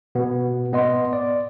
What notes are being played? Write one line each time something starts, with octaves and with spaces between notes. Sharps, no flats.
B2 B3
B3 D#5 C6
D5